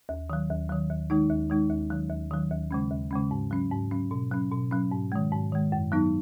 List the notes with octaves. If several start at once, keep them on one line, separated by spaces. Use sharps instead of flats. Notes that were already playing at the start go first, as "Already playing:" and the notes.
D#2
D#3 F#3
D#2
D#3 F#3
D#2
D#3 G#3 D#4
D#2
D#3 G#3 D#4
D#2
D#3 F#3
D#2
D#3 F#3
D#2
C#3 G#3 C#4
D#2
C#3 G#3 C#4
G#2
F#3 C#4
G#2
F#3 C#4
B2
F#3 C#4
B2
F#3 C#4
G#2
D#3 G#3
G#2
D#3 G#3
F#2
F#3 B3 D#4